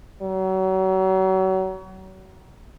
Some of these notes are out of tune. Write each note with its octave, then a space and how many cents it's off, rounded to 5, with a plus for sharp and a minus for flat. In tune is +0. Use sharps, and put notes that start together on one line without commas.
F#3 +35